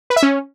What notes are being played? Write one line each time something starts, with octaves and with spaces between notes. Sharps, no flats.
B4
E5
C#4